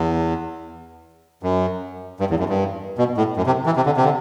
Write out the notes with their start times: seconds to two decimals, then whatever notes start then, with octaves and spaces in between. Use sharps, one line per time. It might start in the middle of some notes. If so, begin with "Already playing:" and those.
Already playing: E2
1.43 F#2
2.20 G2
2.30 E2
2.39 F#2
2.49 G2
2.98 B2
3.17 A2
3.37 F#2
3.46 C3
3.66 E3
3.76 C3
3.86 D3
3.97 C3
4.05 D3